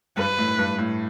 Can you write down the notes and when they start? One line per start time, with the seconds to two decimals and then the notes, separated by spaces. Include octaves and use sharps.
0.17 G2 B4
0.38 A2
0.59 G2
0.79 A2